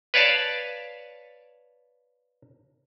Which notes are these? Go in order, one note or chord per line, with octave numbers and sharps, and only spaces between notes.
B4 C#5 D5 F5 A5